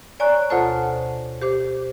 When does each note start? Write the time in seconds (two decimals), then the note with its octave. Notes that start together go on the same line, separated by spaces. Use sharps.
0.20 C#5 D5 G#5 A#5 C#6 F#6
0.50 D2 B2 F4 A4 C5 A5
1.42 G4 C5 D6